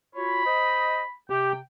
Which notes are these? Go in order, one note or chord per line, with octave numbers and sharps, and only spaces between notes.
F4 F#4 C#5 B5
C5 D#5
C3 G4 G5